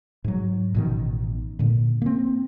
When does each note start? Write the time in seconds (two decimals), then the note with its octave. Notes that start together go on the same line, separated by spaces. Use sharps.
0.24 G#2 F#3
0.74 A1 B2 D#3
1.59 A#2 D3
2.02 A#3 C4